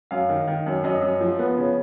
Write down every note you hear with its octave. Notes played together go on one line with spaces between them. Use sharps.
F#2 F5
D#3
D#3
F#2
F#2 D#5
F#2
F3
B3
C#3